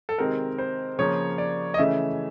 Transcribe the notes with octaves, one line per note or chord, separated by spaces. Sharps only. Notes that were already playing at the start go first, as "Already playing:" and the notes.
A4
C3 D#3 G#3 C4 A#4
C5
C#3 F3 A#3 C#5
D5
D#5
C#3 E3 A3 C#4 E5